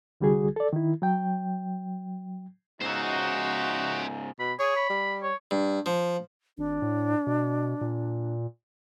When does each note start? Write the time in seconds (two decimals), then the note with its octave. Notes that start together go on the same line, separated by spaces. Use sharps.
0.21 C2 D3 G3 F#4 G#4
0.56 A4 D5
0.73 D#3 E4
1.02 F#3 G5
2.81 G#2 C#3 D#4 F#4 C5 E5
4.39 B2 B5
4.59 G#4 C#5
4.76 B5
4.90 G3
5.22 C#5
5.51 G2
5.86 F3
6.58 G#1 D4
6.82 A2
7.27 B2
7.81 A#2